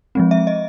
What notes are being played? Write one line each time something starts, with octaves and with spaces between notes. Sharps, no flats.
F3 G#3 C4
E5
D#5